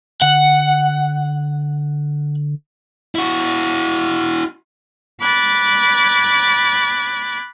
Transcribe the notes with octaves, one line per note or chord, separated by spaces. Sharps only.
D3 F#5
E4 F#4
B5 D6 F#6 G#6 A6